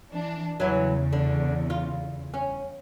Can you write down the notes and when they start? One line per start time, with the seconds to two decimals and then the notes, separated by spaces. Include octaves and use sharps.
0.11 E3 D4
0.60 E2 C#3 E3 F#3
1.13 D3
1.70 F4
2.34 C#4